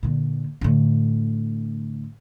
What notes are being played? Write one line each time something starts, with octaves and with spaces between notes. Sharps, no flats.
A#2 D3
A2 D3